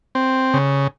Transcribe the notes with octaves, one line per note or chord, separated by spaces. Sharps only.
C4
C#3